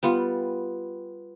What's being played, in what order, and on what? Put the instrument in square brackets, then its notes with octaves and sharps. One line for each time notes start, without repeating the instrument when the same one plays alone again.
[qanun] G3 B3 F4